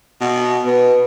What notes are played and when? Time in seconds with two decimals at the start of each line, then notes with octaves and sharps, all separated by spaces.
0.21 B2
0.65 B2 B4